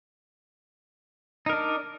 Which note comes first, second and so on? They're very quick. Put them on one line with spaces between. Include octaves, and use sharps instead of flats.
D#4 A#4 D4